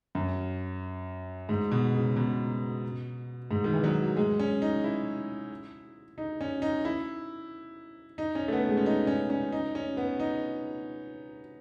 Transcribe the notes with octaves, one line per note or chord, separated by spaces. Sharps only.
F#2
G#2
B2
C#3
B2
G#2
D#3
E3
F#3
G#3
C#4
D#4
E4
D#4
C#4
D#4
E4
D#4
C#4
A3
B3
G#3
C#4
D#4
C#4
C#4
D#4
C#4
B3
D#4